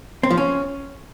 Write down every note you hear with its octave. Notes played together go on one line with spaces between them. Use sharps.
C4
F3
C#4